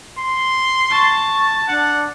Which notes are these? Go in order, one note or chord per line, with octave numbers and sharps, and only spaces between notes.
C6
A5 C#6
D4 F#5